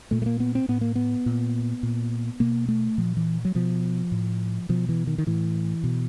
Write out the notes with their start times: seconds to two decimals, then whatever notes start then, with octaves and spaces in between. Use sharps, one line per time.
0.11 A#2 A3
0.22 A3
0.26 A#3
0.40 B3
0.55 C4
0.68 A2 B3
0.81 A#3
0.95 B3
1.26 A#2
1.83 A#2
2.40 B2 A#3
2.68 A3
2.98 A#2 F3
3.17 E3
3.45 F#3
3.55 B2 F3
4.12 A2
4.69 B2 F3
4.89 E3
5.07 D#3
5.18 D#3
5.27 A2 E3
5.84 B2